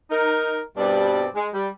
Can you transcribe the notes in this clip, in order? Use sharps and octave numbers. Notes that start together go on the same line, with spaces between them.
D#4 A#4
G2 B2 G3 C4 D4 D5
G#3
G3